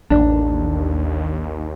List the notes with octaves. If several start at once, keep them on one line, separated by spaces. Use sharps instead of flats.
A1 D#2 D4